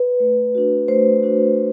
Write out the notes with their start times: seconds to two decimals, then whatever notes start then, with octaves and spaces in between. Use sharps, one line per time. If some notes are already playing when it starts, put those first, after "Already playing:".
Already playing: B4
0.20 A3
0.55 D4 F#4
0.88 A3 C5
1.23 D4 F#4